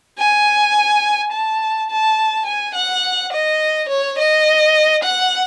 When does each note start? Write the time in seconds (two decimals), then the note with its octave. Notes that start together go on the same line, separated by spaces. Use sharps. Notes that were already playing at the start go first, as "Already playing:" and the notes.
0.18 G#5
1.32 A5
1.90 A5
2.46 G#5
2.74 F#5
3.32 D#5
3.88 C#5
4.18 D#5
5.03 F#5